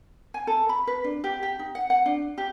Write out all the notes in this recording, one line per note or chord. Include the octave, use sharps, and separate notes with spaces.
G#5
A4
B5
B4
D4
G4
G4
D#4
F#5
F#5
D4
G4